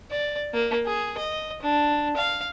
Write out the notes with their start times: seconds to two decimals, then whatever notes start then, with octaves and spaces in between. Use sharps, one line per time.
0.10 D5
0.53 A#3
0.86 G#4
1.17 D#5
1.62 D4
2.16 F5